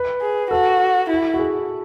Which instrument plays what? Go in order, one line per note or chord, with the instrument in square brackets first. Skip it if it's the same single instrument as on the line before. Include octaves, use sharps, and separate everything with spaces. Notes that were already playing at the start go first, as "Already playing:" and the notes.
Already playing: [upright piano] B4
[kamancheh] G#4
[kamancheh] F#4 [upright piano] A4
[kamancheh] E4
[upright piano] F#4
G#4